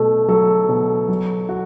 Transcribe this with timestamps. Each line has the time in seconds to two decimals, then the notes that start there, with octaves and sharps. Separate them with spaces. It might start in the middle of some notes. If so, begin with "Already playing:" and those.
Already playing: B2 A3 A4
0.28 F#3 A4
0.69 B2
1.09 F#3
1.49 F#4